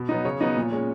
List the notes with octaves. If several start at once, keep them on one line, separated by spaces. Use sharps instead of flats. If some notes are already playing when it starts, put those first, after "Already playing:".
Already playing: B2
F#3 B3 D#4
C#3 C#5
F#3 B3 D#4
A#2
G#3 C#4